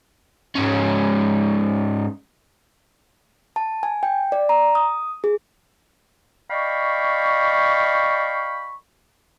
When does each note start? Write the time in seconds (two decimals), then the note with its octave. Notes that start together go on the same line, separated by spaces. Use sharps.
0.55 G#2 C#4
3.56 A5
3.83 G#5
4.03 G5
4.32 D5
4.49 A#5
4.75 D#6
5.24 G#4
6.51 D5 D#5 F5 G5 B5 C#6